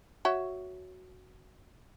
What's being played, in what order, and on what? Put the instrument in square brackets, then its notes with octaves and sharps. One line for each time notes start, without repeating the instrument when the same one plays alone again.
[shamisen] F#4 C#5 E5